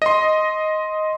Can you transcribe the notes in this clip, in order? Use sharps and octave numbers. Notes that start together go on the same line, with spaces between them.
D#5 C6